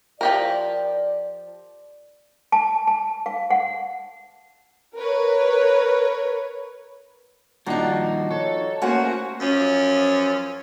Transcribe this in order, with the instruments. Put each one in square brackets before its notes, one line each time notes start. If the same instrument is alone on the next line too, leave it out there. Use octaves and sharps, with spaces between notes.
[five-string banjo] F3 G4 A#4 [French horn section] D5
[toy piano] A5
A5
F5
F#5
[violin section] A#4 B4 C#5
[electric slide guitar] G2 A#2 D#3 [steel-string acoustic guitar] F3 D#4 [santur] D4 F#4 A#5
[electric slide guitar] A4 [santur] C#5
[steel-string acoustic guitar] A3 F#5 [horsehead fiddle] A#3 F#4 [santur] C#4 C5 G#5
[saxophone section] F#2 F3 C#4